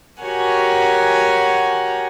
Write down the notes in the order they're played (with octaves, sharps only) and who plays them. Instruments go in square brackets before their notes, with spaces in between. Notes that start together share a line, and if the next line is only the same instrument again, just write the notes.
[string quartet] F#4 G4 A#4 C#5 F#5 G#5